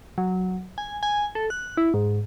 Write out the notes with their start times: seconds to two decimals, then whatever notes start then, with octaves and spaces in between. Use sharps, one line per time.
0.18 F#3
0.78 G#5
1.03 G#5
1.35 A4
1.50 F#6
1.77 E4
1.94 G#2